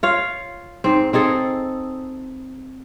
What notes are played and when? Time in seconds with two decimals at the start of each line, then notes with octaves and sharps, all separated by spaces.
0.03 F4 C#5 F5
0.84 G#2 C4
1.13 C4 D#4 G#4 A4